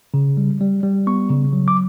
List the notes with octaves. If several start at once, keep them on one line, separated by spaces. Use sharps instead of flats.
C#3
G3
G3
G3
B3 C#6
C#3
F#3
D6